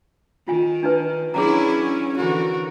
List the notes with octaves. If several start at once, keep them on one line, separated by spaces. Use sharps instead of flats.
D#3 F4 G#5
D4 D#4 B4
F#3 C#4 D4 E4 G#4 A#5
D3 E3 F#4 A#4